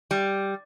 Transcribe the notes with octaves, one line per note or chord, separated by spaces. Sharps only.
G3